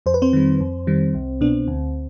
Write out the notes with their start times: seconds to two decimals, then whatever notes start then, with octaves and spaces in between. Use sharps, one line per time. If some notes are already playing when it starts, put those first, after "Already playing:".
0.06 F2 C5
0.14 B4
0.22 C4 C5
0.33 D#3 G3
0.60 F2
0.87 D#3 G3
1.14 C2
1.41 B2 B3 D4
1.68 D2